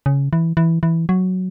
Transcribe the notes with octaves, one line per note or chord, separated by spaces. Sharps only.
C#3
E3
E3
E3
F#3